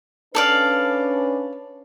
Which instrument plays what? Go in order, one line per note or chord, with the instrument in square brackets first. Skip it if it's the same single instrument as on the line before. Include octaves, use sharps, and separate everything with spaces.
[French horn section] C#4 D4 B4 [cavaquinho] A4 D5 F5